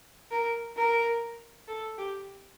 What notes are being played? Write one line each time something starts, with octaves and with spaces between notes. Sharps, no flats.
A#4
A#4
A4
G4